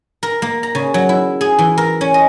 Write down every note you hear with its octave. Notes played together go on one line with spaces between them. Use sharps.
A#4
A#3
A#5
C#3
F#3
E4
G#4
E3
A#4
C#4
D#5